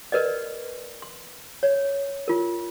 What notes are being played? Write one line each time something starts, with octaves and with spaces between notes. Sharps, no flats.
A#4 B4 D5 D#5
C6
C#5
F4 A#4